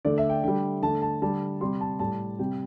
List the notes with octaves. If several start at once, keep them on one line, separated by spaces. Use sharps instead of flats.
D3 A3 D5
E5
G5
D3 G3 G5
D3 A3 A5
A5
D3 G3 A5
C3 G3 C6
A5
A2 G3 A5
C3 G3 G5